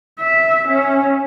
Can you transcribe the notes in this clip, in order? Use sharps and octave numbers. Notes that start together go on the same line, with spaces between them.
E5
C#4